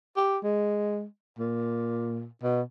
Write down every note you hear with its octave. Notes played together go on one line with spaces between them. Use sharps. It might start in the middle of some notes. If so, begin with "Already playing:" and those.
G4
G#3
A#2
B2